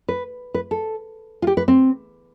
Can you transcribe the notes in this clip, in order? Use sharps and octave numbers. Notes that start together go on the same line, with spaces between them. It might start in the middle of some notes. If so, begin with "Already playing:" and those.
B4
B4
A4
F4
G4
B4
C4